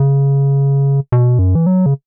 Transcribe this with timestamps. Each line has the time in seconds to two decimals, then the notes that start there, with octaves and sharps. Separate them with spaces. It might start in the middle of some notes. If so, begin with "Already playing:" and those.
Already playing: C#3
1.12 B2
1.39 F#2
1.55 E3
1.66 F#3
1.86 C#3